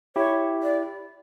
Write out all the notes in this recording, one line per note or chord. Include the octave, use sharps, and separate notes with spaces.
E4 G4 C#5
D5